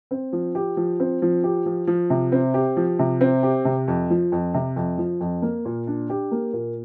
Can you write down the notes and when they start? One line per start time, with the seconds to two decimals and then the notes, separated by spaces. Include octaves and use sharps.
0.11 C4
0.33 F3
0.55 G4
0.77 F3
1.00 C4
1.22 F3
1.44 G4
1.66 F3
1.87 F3
2.10 C3
2.32 C4
2.54 G4
2.77 F3
2.99 C3
3.21 C4
3.43 G4
3.65 C3
3.88 F2
4.10 F3
4.32 F2
4.54 C3
4.76 F2
4.98 F3
5.21 F2
5.42 A#3
5.65 A#2
5.87 D4
6.10 G4
6.31 A#3
6.53 A#2